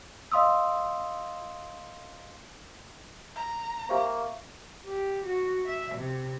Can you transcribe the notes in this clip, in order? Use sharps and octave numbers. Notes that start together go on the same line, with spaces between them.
D#5 F5 C6 D#6 E6
A#5
A#3 C4 G4 C5 E5 F5 C#6
G4
F#4
E5
C3